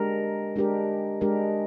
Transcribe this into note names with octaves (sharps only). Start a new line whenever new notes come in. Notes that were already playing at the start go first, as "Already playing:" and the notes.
Already playing: G#3 D4 G4 A#4
G#3 D4 G4 A#4
G#3 D4 G4 A#4